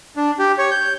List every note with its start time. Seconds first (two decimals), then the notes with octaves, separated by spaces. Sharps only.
0.17 D4
0.39 G4
0.58 C#5
0.71 G6